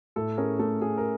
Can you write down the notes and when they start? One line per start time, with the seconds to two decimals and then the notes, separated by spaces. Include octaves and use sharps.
0.16 A2 A4
0.37 C#4 G#4 A#4
0.59 A3 A4
0.82 C#4 G#4
0.98 A#4